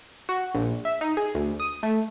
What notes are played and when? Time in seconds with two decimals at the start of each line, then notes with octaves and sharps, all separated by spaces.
0.29 F#4
0.55 A#1
0.85 E5
1.01 D#4
1.17 G#4
1.35 D2
1.60 D#6
1.83 A3